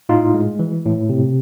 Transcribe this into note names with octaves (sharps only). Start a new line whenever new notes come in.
A2 D#4 F4
G#3
E3
A2
C3